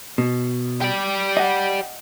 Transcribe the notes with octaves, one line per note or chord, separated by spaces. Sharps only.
B2
G4 D5
D#5 F#5